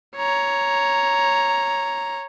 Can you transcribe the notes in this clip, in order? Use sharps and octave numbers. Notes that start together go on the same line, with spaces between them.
C#5 A#5